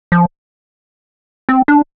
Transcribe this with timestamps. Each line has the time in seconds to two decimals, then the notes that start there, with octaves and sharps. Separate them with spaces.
0.12 F3
1.49 C4
1.68 D4